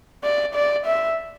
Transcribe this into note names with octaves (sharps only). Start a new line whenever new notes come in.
D5
D5
E5